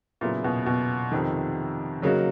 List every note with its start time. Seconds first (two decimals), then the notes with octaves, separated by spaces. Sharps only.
0.21 A#2 C#3 F#3 B3 E4 G#4
0.44 B2
0.66 B2
1.11 F2 C3 D#3
2.02 C#3 F#3 A#3 D#4 F#4